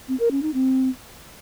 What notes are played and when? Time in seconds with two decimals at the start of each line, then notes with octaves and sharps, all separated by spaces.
0.08 C4
0.20 A#4
0.31 C#4
0.42 D#4
0.54 C4